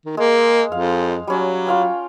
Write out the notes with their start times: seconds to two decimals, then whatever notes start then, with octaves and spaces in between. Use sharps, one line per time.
0.06 D#3
0.17 G#3 A#3
0.72 F2 F5
1.27 F#3 G3 C#4
1.67 F4 F5 G5